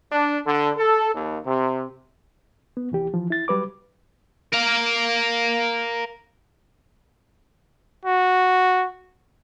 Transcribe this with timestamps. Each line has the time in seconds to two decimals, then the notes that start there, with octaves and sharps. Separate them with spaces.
0.11 D4
0.45 D3
0.77 A4
1.14 D#2
1.45 C3
2.77 B3
2.92 C2 E3 G4
3.14 E3 F3
3.30 E4 A6
3.48 F#3 G3 B4 D6
4.53 A#4 F5
8.05 F#4